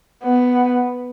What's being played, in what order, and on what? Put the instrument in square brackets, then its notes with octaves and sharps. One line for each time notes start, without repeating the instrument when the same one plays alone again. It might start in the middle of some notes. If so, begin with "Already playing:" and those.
[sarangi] B3